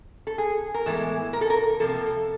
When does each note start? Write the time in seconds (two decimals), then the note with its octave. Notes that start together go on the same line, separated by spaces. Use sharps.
0.27 A4
0.38 G#4
0.74 A#4
0.86 A2 E3 G#3 B3 A4
1.33 A#4
1.41 A4
1.50 A#4
1.80 C3 F3 A#3 A4